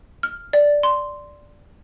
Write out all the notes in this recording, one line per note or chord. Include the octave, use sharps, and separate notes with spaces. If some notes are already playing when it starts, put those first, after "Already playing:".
F6
D5
C6